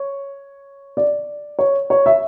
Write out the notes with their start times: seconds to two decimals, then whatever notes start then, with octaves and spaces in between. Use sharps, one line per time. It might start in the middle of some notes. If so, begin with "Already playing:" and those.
Already playing: C#5
0.97 D5
1.59 C#5
1.90 C#5
2.06 E5